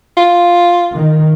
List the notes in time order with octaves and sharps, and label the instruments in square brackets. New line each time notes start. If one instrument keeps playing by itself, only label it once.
[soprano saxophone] F4
[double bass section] D#3